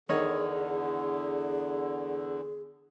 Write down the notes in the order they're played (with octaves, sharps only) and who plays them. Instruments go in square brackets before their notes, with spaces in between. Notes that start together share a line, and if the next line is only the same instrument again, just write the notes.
[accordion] E2 D3 [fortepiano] D#3 C#5 D#5 [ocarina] G#4